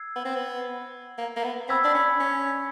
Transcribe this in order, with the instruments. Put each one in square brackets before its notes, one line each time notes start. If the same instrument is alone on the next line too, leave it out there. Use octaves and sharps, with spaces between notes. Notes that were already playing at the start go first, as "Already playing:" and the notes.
Already playing: [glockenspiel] E6 G#6 C7
[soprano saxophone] B3
C4
B3
A#3
A#3
B3
[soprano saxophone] C4 [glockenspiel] B5 E6 G#6 B6
[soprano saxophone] D4
C#4
C#4